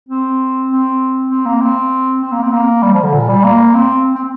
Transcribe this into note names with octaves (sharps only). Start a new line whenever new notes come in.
C4
C4
C4
A#3
C4
C4
A#3
C4
A#3
G3
F3
D3
A#2
G3
A#3
C4
C4